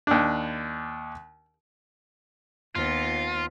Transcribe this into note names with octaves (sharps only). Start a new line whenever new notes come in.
D#2 D4
D#2 B3 F4